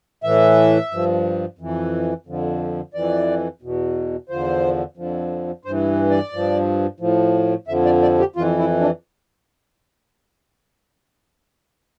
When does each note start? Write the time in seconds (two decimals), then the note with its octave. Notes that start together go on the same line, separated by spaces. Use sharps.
0.23 A2 E3 E5
0.91 G2 F3
1.59 F2 E3
2.26 F2 D3 F3
2.94 F2 E3 D5
3.62 E2 B2
4.29 E2 D3 F3 C5
4.97 F2 D3 F3
5.65 G2 E3 C5
6.10 D5
6.33 G2 F3
7.00 A2 F3
7.68 F2 D3 F3 E5
7.85 D5
8.02 D5
8.19 G4
8.36 F2 E3 F4
8.59 E4
8.81 D4